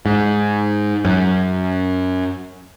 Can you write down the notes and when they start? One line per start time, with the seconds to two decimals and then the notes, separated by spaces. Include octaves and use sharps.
0.06 G#2
1.05 F#2